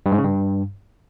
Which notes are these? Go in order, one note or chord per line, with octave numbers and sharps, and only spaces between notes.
G2
G#2
C#3
G2